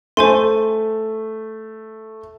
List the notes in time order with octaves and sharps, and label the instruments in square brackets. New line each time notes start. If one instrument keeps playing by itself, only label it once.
[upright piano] A3 [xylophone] C5 G#5 C6